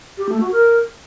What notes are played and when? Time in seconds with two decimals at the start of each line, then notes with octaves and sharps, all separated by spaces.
0.18 G4
0.29 A3
0.40 F#4
0.52 A#4